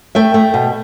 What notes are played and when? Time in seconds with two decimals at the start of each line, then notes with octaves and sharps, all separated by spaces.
0.15 A3 E5 G5
0.34 A3
0.54 B2